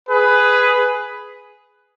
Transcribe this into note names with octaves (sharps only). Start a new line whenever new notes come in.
G#4 B4